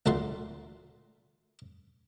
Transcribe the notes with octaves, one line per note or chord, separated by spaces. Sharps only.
D2 A#2 A3 F#5 C6